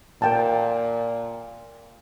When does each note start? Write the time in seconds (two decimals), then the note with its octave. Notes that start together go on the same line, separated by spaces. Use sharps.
0.22 A#2 A#4 G5 A5